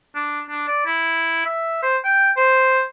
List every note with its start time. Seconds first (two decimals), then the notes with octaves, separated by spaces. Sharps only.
0.15 D4
0.50 D4
0.68 D5
0.86 E4
1.46 E5
1.83 C5
2.05 G5
2.37 C5